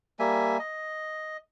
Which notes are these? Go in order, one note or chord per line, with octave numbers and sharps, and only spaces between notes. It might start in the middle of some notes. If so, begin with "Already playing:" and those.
G3 A#3 E5 G#5
D#5